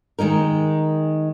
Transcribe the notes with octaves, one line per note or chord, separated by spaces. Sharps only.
D#3 G#3 D#4 A#4